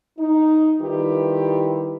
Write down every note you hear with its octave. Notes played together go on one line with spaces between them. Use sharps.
D#4
D#3 G3 E4 F4 G4 B4